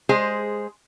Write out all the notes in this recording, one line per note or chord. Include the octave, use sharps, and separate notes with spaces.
G#3 G#4 C5